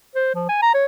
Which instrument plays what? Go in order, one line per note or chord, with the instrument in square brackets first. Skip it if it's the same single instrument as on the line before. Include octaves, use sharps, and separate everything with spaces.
[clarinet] C5
F3
G#5
A#5
C#5